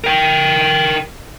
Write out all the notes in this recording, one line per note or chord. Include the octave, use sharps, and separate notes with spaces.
A#4 G5